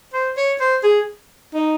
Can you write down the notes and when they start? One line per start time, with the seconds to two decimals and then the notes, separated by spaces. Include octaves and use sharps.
0.14 C5
0.37 C#5
0.60 C5
0.83 G#4
1.54 D#4